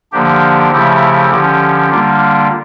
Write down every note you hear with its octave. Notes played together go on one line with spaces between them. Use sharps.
D3 F3 A#3 D4 G4
C#3 F3 A3 E4 G4
D3 F3 C#4 G4
D3 G3 A#3 D4 F4